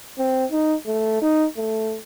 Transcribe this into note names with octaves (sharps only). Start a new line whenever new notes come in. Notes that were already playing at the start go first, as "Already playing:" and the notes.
C4
D#4
A3
D#4
A3